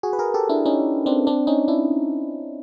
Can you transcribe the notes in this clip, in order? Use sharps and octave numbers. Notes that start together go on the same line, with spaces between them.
F#4 G#4
B4
G#4 A#4
G4 A4
D4 E4
C#4 D#4
C4 D4
C4 D4
C#4 D#4
D4 E4